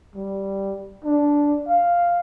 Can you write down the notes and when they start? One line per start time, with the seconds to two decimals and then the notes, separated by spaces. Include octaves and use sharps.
0.15 G3
1.04 D4
1.68 F5